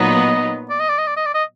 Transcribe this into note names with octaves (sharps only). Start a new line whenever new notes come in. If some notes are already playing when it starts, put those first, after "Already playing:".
Already playing: A#2 F#3 B3 D#4 D#5
D5
D#5
D5
D#5
D5
D#5
D5
D#5